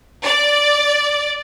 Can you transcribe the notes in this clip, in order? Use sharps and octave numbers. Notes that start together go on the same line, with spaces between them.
D5